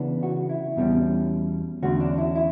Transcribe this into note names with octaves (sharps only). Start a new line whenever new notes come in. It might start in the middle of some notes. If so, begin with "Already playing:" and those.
Already playing: C#3 E3 B3 D4
F#4
E4
E2 B2 G3 C#4
E2 D3 A3 C#4 F#4
D4
E4
E4